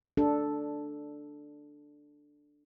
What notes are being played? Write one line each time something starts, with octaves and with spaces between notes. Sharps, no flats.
D4 A4